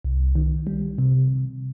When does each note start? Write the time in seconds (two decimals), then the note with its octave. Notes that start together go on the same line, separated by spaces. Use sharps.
0.05 C2
0.35 D#3
0.67 G3
0.98 C3